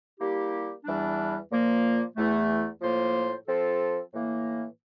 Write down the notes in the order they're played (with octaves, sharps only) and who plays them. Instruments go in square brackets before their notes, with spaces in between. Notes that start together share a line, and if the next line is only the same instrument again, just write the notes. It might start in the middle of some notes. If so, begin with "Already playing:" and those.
[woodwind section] G3 A#3 E4 G4
E2 E3 G3 D4
A#2 F3 A#3
E2 E3 A3
A2 F3 A#3 F4 C5
F3 C4 F4 A4
A2 E3 A#3